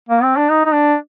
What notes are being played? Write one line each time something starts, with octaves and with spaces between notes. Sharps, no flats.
A#3
C4
D4
D#4
D#4
D4